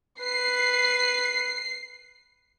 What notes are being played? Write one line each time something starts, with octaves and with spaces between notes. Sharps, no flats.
B4 C7